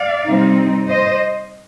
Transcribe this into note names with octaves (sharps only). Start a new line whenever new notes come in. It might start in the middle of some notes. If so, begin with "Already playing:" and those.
Already playing: D5 F5
C3 G3 C4 D#4
C5 D#5